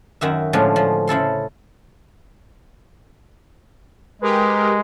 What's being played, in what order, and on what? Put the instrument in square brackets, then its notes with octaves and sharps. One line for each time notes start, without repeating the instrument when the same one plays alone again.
[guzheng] F#2 D#3 F#4 E5
A2 D3 F3 G#3 C#4
F3
C#3 E4 A4 C6
[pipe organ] G#3 [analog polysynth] G4 A#4 B4